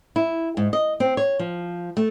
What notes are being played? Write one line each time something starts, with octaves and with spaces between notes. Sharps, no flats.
E4
G#2
D#5
C4
C#5
F3
A3